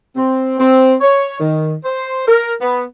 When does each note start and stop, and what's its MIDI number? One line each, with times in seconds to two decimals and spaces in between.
0.16 0.59 60
0.59 0.94 60
1.01 1.37 73
1.39 1.74 51
1.84 2.26 72
2.28 2.52 70
2.60 2.83 59